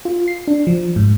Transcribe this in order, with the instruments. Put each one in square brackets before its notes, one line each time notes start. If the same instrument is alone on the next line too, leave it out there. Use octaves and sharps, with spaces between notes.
[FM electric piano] F4
C7
D4
F3
G#2